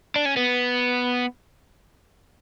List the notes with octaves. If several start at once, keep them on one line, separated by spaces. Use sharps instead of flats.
D4
C#4
B3